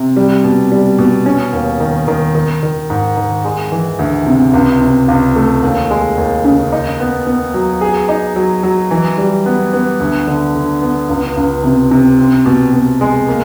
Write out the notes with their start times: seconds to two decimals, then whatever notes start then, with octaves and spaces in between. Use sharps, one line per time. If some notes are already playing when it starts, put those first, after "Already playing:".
Already playing: C3
0.16 G3
0.44 B2
0.72 G3
0.99 B2
1.26 C#4
1.53 D#2
1.80 D#3
2.08 D#3
2.35 D#3
2.63 D#3
2.90 G#2
3.17 D#3
3.45 G#3
3.72 E3
3.99 D2
4.27 C3
4.54 C#2
4.81 C3
5.08 C#2
5.36 A3
5.63 D#2
5.90 G#3
6.18 D#2
6.45 C#3
6.72 D#4
7.00 B3
7.27 B3
7.54 F#3
7.81 G#4
8.09 D#4
8.36 F#3
8.63 F#3
8.91 E3
9.18 G3
9.46 B3
9.73 B3
10.00 D2
10.27 D3
10.55 D3
10.82 B3
11.09 C#2
11.37 C#2
11.64 C3
11.91 C3
12.18 C4
12.46 B2
12.73 B2
13.01 G#3
13.28 A#3